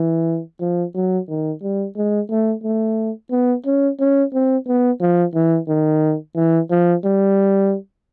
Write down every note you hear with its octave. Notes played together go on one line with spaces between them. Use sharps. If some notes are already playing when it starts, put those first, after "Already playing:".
Already playing: E3
F3
F#3
D#3
G3
G#3
A3
A3
B3
C#4
C#4
C4
B3
F3
E3
D#3
E3
F3
G3